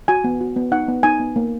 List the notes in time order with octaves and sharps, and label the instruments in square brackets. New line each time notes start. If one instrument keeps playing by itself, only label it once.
[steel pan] F#4 G#5
B3
F#4
B3
D#4 F#5
B3
D#4 G#5
B3
A#3